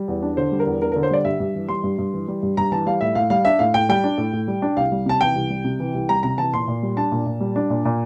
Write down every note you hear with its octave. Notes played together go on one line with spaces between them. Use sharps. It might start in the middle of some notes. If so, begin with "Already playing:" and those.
Already playing: G3
E2
D4
D3 C5
G3
A#4
E2
D4 A#4
D3 A#4
C5
G3 D5
G2 E5
G2
E3
G3 C6
G2
G2
E3
G3
G2
G2 A#5
E3 A5
G3 F5
A2 E5
A2 F5
G3 F5
D4 E5
A2 F5
A2 G5
G3 G5
D4
A2
A2
G3
D4
C2 F5
G3
C3 A5
E3 G5
C2
G3
C3
E3
C2
G3 A#5
C3 A#5
E3 A5
A#2 C6
A#2
G3
D4 A5
A#2
A#2
G3
D4
A#2
A#2